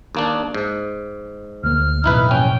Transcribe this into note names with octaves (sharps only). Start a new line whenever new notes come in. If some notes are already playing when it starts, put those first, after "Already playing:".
D#2 A#3 D4
G#2
D2 A#3 F6
A1 F#2 B2 D#4 E4 B4
A#1 C#4 G5